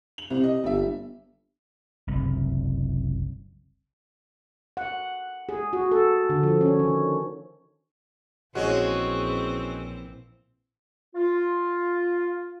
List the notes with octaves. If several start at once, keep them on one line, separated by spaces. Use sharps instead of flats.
F#7
C2 C3
D#5
G1 G3 E5
F#1 C2
F#5
G#4
F#4
A4
D3
F3
C#4
D#3
A#1 E3 G#3 C4 C#4 F#4 C#5
F4